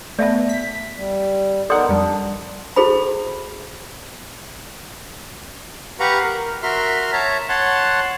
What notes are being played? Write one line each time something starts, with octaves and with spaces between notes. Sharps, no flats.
A3 B3 D5 E5 A5
B6
G3
B3 D#4 A4 A#4 D5 F#5 C6 D#6
F2 G3 D4
E4 F#4 G#4 A4 C5 B5
G4 B4 F5 F#5 A#5 C#6
A#4
F#4 A#4 E5 C6 F6
C#5 E5 A5 A#5
C#5 F#5 A5 C6